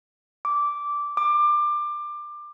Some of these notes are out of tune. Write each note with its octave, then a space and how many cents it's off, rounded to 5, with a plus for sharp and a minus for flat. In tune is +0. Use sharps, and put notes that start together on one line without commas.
D6 -10
D6 +20